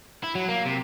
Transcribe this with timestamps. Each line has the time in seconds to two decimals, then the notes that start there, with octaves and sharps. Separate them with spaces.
0.23 E4
0.35 F#3
0.48 A#3
0.66 C3